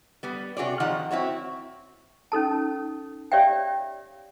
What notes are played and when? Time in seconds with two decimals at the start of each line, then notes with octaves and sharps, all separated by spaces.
0.23 G3 B3
0.57 C3 F#4 G#4 C#5 D5
0.80 D#3 F3 F#5 A#5
1.11 C4 E4 F#4 C#5
2.32 C#4 D#4 A4 A5
3.32 G4 C#5 D5 E5 F5 G5